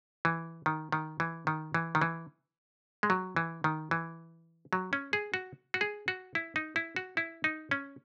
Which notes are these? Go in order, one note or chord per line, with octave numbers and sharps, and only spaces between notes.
E3
D#3
D#3
E3
D#3
E3
D#3
E3
G#3
F#3
E3
D#3
E3
F#3
C#4
G#4
F#4
F#4
G#4
F#4
E4
D#4
E4
F#4
E4
D#4
C#4